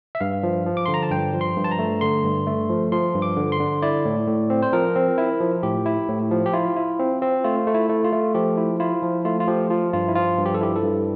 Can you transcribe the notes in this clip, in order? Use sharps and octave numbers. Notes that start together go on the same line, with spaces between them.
E5
G2 F5
F3
F3
D6
D3 C6
A#5
A5
G2 G5
F3
C6
G2
A5
A#5
A3
D3 C6
G2
A3
F3
F3 C6
G2
D6
D3
C6
D3
E4 D5
A2
A2
C4
C5
F3 A#4
C4
E4
F3
A2 G4
E4
A2
F3
G4
E4 F4
E4
C4
C4
A3 F4
A3
E4
A3
F4
A3
F3 G4
E4
E4 F4
F3
A3 F4
F4
F3 G4
F3 F4
G2 F4
E4
F3 F4
G2
G4
A4
E4 G4
A4
G2